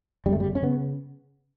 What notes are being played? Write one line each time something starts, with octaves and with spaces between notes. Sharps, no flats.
G1 F#2 C#3 G3
A3
G3
C#4
C#3 B3